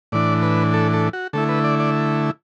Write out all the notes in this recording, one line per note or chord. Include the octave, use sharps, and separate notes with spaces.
A2 E3 D4 D5
B4
A4
A4
F#4
D3 A3 E4 A4
B4
D5
D5